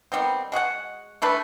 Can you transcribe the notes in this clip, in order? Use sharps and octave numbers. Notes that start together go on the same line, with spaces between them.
D#3 G3 B3 C4
G#3 F#4 G#4 F#5
E3 A3 D4 B4